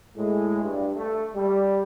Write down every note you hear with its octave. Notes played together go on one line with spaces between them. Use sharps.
A2 G#3
G2
A3
G3